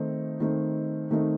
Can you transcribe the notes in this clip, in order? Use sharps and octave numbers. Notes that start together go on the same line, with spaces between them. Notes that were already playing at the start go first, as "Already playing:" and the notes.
Already playing: D#3 A3 C4 D#4
D#3 A3 C4 D#4
D#3 A3 C4 D#4